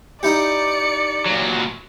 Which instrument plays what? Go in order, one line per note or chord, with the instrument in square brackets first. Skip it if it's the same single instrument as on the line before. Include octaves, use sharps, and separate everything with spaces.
[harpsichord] D#4 E4 G4 [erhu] D5 [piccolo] C#7
[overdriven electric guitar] A#2 F#3